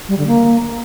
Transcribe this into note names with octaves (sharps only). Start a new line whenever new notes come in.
G3
D3
A#3